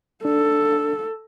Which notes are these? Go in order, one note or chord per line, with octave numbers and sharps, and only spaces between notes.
D4 A4